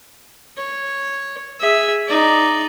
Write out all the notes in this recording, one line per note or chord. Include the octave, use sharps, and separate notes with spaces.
C#5
G#4 E5
D#4 D5